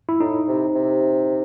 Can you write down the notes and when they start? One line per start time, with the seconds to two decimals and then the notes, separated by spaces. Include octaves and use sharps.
0.09 E4
0.20 A2 D#4
0.48 C3
0.75 C3